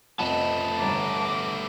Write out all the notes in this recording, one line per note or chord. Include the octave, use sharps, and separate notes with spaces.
F1 F2 A3 B3 D#5 A5
G1 C#5 A#5 D6